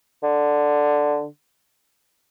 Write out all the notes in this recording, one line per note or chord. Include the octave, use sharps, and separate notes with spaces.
D3